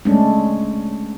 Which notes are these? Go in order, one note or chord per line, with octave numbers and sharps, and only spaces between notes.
G#3 A3 C#4 D4